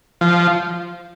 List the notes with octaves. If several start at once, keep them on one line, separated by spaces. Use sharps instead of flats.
F3